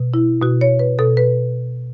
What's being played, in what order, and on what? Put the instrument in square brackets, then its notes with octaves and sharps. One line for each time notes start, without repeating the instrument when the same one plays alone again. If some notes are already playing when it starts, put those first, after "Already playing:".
Already playing: [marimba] B2
E4
B2 F#4
C#5
B4
B2 A4
B4